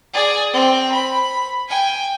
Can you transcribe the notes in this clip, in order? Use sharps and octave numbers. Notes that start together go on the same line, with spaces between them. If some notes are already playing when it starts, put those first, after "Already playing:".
G#4 D5
C4 G5
B5
G5 G#5